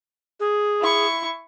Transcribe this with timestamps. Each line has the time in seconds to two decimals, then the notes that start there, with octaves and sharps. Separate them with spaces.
0.40 G#4
0.81 E4 C#6